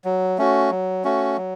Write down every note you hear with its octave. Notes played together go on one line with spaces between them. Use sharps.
F#3
A3 C#4 F#4
F#3
A3 C#4 F#4
F#3